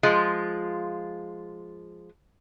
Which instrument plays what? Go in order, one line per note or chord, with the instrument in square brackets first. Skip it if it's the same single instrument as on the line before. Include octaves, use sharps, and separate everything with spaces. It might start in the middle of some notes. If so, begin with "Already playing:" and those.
[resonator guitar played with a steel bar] F3 G#3 F4